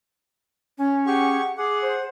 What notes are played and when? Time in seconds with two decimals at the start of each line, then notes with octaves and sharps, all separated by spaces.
0.78 C#4
1.07 G4 G#4 F#5 C#6
1.57 G#4 F#5 D6
1.82 C5